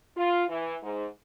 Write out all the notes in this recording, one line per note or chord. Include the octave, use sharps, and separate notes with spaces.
F4
E3
G#2